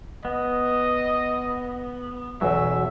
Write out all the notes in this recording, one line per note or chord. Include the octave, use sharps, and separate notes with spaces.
B3 D#5
B1 E2 F#3 E5